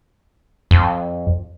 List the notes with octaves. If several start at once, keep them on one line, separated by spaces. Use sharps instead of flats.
F2